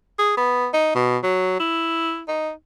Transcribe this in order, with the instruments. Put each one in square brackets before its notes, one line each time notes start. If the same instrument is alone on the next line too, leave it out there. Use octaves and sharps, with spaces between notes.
[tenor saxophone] G#4
B3
D#4
B2
F#3
E4
D#4